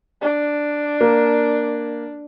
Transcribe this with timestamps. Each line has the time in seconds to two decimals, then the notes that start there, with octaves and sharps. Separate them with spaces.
0.21 D4
1.01 A#3